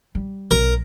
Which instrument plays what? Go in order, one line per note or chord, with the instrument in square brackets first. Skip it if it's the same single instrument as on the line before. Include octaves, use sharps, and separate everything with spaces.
[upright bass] G3
[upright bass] B1 [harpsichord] A#4